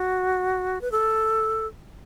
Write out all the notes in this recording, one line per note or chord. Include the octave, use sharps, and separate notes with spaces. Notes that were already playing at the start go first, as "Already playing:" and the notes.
Already playing: F#4
B4
A4